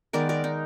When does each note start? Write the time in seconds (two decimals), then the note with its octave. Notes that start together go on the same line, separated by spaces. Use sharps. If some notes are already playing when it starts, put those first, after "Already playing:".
0.13 D#3 G#3 B3 A#4 D5
0.29 A#4 D5
0.44 D#4